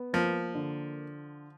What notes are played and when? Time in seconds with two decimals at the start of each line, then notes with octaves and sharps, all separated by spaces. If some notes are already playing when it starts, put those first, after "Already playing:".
Already playing: B3
0.13 F3 A#3
0.55 D3